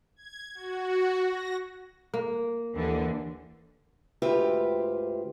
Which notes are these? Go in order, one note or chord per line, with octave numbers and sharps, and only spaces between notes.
G#6
F#4
A#6
A#3
D#2 D3 E3
D2 G#2 F4 G4 B4 E5